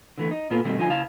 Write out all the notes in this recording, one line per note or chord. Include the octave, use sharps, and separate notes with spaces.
D3 E3 A3
D#4
A#2 A#3 B3 F4 A4
B2 D#3 G3 A3 C4
D3 F3 D#4 F4 G#5
C#3 E4 F5 A5